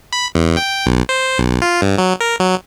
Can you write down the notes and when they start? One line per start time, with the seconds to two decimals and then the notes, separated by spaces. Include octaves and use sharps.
0.13 B5
0.35 E2
0.57 G5
0.86 B1
1.09 C5
1.38 B1
1.62 F4
1.82 G2
1.98 F#3
2.20 A#4
2.40 F#3